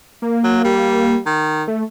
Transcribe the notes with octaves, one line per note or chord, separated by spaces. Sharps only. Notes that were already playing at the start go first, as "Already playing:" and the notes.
A#3
F#3
G3
D#3
A3